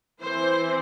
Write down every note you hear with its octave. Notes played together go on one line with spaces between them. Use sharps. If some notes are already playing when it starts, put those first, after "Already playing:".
E3 C4 E4 C5